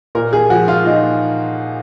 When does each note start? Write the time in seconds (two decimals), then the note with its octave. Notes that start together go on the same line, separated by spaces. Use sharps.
0.15 A#2 A#4
0.33 G#4
0.50 F3 F#4
0.68 F4
0.85 A#2 D#4